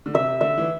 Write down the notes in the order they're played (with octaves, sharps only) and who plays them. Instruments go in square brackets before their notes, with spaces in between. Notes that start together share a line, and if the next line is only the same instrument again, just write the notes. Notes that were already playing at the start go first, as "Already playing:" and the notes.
[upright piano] D3
[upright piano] C3 [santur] E5
[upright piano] D3 [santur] E5
[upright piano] E3